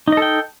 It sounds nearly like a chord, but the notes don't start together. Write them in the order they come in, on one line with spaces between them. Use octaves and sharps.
D#4 D#5 A4 G5